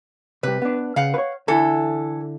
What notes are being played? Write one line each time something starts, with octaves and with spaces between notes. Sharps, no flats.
C3 G3 B4
B3 D4
C#3 F5 F#5
B4 C#5
D3 E3 E4 A4